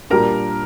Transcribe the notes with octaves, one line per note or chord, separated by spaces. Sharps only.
A#2 G3 D4 A#4 A#5